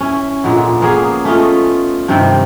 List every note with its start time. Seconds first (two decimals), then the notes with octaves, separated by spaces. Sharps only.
0.01 C#4 E4
0.44 A#2 D3 G#3 B3
0.82 A#3 B3 C#4 G#4
1.25 A3 C#4 F4 D#5
2.08 G2 C3 D#3 C4